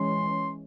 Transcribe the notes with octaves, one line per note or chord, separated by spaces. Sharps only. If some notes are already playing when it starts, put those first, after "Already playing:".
Already playing: E3 G#3 C#4 C6